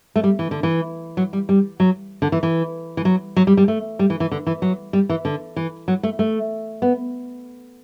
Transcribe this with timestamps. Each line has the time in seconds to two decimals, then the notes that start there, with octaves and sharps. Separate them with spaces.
0.16 A3
0.24 G3
0.39 E3
0.51 D3
0.63 E3
1.17 F#3
1.33 G3
1.49 G3
1.80 F#3
2.22 D3
2.32 E3
2.43 E3
2.97 E3
3.05 F#3
3.36 F#3
3.47 G3
3.57 G3
3.68 A3
3.99 G3
4.10 E3
4.20 E3
4.32 D3
4.47 E3
4.62 F#3
4.93 G3
5.09 E3
5.25 D3
5.56 E3
5.88 F#3
6.03 A3
6.19 A3
6.82 B3